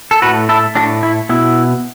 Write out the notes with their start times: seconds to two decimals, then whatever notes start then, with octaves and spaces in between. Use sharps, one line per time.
0.11 A4
0.22 A2 A3 F#4 B4
0.49 E4 A4
0.75 A2 A3 D4 F#4
1.03 E4
1.29 B2 B3 E4